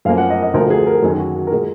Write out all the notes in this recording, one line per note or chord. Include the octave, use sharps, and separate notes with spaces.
F#2 F3 A#3 F5
F#5
D#5
D#5
D2 D3 F3 A#4
G#4
A#4
F#2 D#3 F#3 A#3 G#4
F#4
F#4
A#4
A#2 G#3 G#4